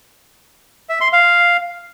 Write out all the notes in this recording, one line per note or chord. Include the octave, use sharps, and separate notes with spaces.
E5
C6
F5